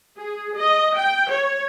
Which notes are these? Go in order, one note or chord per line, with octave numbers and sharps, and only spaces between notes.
G#4
D#5
G5
C#5